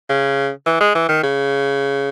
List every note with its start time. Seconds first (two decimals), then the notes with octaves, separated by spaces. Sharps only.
0.09 C#3
0.66 E3
0.80 G#3
0.95 E3
1.09 D#3
1.23 C#3